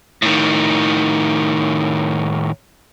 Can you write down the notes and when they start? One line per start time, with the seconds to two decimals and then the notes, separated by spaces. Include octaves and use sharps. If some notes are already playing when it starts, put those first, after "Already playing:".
0.22 A2 D#3